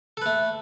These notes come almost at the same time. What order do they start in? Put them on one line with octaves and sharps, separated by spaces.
A4 B4 A3